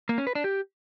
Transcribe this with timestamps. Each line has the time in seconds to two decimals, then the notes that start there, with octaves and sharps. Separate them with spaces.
0.09 A#3
0.18 C#4
0.27 B4
0.35 D4
0.44 G4